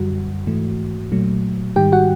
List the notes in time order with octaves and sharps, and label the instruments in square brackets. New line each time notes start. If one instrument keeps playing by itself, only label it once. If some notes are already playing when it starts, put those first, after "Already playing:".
Already playing: [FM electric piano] F#2 D3 G3 F#4
G#2 E3 A3
A#2 F#3 A3
G#2 D#3 G3 G4 G5
F#4 F#5